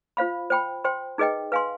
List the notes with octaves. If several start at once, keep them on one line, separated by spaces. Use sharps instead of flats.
F4 C5 F5 B5
C5 G5 B5
C5 G5 C6
D#4 G#4 B4 D#5 G5
B4 F5 G#5 C6